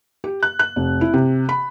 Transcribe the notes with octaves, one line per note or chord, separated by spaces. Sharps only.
G4
F#6
F#6
F1
E4
C3
B5